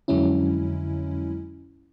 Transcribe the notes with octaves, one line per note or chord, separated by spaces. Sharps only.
F2 D3 F#3 G#3 C#4 E4